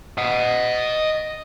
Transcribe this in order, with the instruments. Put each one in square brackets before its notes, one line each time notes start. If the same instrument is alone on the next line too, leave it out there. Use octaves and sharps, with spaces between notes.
[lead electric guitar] D#5 F#5